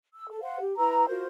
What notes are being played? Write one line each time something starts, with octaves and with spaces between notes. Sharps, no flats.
E6
A4
C5 F5 F#5
G4
E4 B4 A#5 E6
F4 F#4 A#4 C5